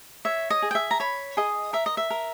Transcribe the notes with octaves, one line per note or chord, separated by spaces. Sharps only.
C#5 E5
D#5
G#4
G5
E5
A#5
C#5 B5
G#4 D#5
A#4 E5
D#5
E5
A#4